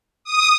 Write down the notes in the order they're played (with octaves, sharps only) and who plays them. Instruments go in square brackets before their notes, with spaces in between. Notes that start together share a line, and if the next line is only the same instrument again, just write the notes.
[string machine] D#6